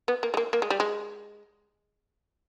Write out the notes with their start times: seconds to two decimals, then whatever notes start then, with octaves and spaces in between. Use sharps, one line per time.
0.08 B3
0.23 A#3
0.34 G#3
0.37 A#3
0.53 A#3
0.62 G#3
0.70 G3
0.80 G#3